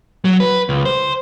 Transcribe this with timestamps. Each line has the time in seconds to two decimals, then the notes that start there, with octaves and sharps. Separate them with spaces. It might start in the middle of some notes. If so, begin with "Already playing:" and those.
0.25 F#3
0.40 B4
0.69 C#2
0.85 C5